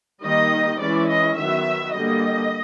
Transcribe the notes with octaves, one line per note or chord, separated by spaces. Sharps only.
D#3 G3 A#3 D#4 D#5
E3 G#3 C#4 E4 D5
D#5
D#3 F#3 B3 E5
D3 G3 A#3 D#5